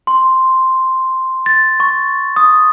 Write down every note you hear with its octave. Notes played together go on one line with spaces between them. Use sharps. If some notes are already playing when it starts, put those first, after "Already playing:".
C6
A6
C#6
D#6